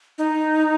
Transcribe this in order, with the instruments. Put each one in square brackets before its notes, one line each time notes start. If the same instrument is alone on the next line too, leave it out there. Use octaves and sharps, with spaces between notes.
[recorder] D#4